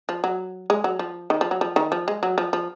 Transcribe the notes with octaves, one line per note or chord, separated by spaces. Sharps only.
F3
F#3
G#3
F#3
F3
D#3
F3
F#3
F3
D#3
F3
G#3
F#3
F3
F3